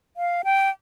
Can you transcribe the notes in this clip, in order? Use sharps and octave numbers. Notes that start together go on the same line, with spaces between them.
F5
G5